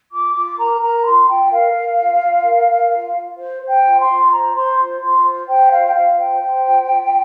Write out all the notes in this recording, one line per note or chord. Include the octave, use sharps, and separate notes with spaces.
F4 D6
F4 D6
A#4 A#5
A#4 A#5
F4 C6
F4 G5
A#4 F5
A#4
F4
F4
A#4
A#4
F4
F4
C5
C5
G5
F4
C6
F4
C5 A#5
C5 C6
F4
F4 C6
C5
C5 G5
F4 F5
G5
F4 F5
C5 G5
C5
F4
F4